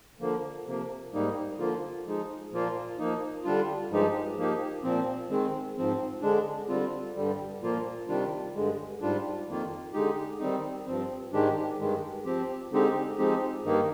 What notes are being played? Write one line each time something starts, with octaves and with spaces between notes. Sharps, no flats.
D3 F3 A#3
C3 F3 A#3
G#2 G3 A#3 D#4
D3 F3 A#3 F4
F3 G#3 D#4
A#2 F3 A#3 F4
F3 A#3 D#4
D3 G3 D4 F4
G2 F3 G#3 D#4 G4
F3 A#3 D#4 G4
A#2 F3 C4
D#3 G#3 C4
G#2 F3 C4
D3 G#3 D4
D3 G3 C4 F4
G2 D3 G3
A#2 F3 A#3 F4
C3 D#3 G3 D4 F4
G2 D3 G#3
G#2 G3 D4 F4
F2 D#3 A#3 F4
D3 G#3 D#4 G4
D#3 G3 C4 D#4
G2 F3 C4
G#2 D#3 G#3 D4 G4
G2 D#3 G#3
F3 C4 G4
D3 G#3 C4 D#4 G4
F3 G#3 C4 D#4 G4
G2 D#3 A#3 D#4